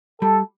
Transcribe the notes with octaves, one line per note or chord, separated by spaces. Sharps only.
G3 A4